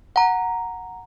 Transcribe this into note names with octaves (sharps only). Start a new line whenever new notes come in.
F#5 A#5